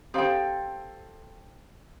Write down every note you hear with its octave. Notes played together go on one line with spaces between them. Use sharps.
C4 G4 A4 C5 F5 G5